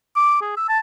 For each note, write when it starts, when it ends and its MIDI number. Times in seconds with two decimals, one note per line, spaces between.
0.16 0.38 86
0.41 0.56 68
0.57 0.67 88
0.69 0.79 81